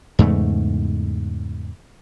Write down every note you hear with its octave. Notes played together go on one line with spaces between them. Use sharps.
E2 G#2 C#3 A3